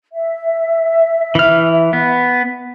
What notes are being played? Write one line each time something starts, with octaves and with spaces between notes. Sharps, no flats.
E5
E3 F6
B3